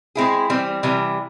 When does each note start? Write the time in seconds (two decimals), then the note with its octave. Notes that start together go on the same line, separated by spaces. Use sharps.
0.15 G#3 C4 E4 G#4
0.50 E3 G3 C4
0.83 C3 E3 G3